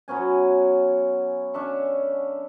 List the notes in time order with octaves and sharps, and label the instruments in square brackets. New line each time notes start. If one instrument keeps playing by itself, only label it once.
[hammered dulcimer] F#3 B3 C#4 G#5
C#4 D4 E5 C#6